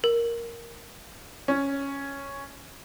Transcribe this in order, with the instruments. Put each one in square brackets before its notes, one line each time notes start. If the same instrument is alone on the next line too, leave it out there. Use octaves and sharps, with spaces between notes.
[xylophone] A#4
[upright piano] C#4